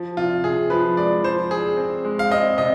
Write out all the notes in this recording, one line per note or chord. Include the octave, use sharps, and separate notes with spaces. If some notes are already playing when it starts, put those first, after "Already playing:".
Already playing: F3
C3 F4
C3 G#4
F3 B4
G#3 D5
F3 C5
C4 G#4
C4
G#3
F5
C4 D#5
C3 D#5